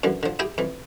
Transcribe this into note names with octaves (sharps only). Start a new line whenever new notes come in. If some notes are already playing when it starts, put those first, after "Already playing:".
F#2 D3 E3
D3 F3
E4 G4 G#4 G5 G#5
F2 E3